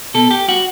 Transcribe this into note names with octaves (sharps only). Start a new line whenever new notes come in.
B2 A4
G4
G3 F#4